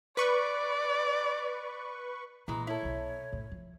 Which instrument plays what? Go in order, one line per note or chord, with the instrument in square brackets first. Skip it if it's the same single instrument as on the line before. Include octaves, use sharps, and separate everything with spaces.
[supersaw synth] B4 C#6 [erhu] D5
[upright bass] A#2 [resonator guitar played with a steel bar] E3 G#3 [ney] A#5
[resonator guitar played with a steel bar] E4 A4 [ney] C#5
[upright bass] B1 B3
A2
F3